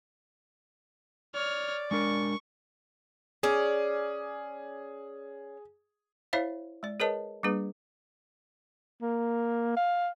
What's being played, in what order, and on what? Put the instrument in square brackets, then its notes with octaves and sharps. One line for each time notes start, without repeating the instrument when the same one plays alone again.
[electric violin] C#5 F6 [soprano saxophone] D5
[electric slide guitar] G#3 D4 A#4 [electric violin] C#6
[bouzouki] C#4 D5 [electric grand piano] G#4
[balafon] E4 C5 C#5 E5 F5
G#3 D5
G#4 A#4 B4 C#5 D#5 A5
G3 A#3 D4 G#4 B4
[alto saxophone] A#3
F5